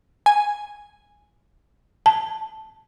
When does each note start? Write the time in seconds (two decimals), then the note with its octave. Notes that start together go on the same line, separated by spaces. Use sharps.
0.26 G#5
2.06 A5